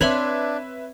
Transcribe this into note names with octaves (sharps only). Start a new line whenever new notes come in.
C4 D4 B4 C#5 E5 B5 C6